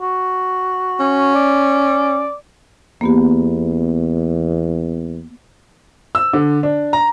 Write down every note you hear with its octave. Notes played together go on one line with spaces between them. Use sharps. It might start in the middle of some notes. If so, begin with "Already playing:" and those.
F#4
C#4
D5
E2 A#3 B3 G4
E6
D3
D4
A#5